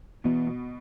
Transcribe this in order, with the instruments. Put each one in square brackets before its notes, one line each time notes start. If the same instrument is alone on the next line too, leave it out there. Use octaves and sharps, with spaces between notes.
[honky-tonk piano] B2 [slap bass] E3 B3
[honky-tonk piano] B2